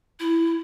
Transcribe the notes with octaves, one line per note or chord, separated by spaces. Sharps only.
E4